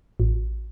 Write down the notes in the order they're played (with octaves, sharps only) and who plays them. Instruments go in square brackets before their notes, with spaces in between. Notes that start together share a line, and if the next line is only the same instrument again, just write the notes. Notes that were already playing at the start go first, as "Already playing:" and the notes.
[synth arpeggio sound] A1